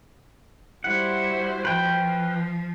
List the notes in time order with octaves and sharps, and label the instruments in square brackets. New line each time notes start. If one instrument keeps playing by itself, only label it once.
[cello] G3 E4 [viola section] F#4 C5 [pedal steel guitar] F#5
[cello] F3 [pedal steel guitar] B4 G5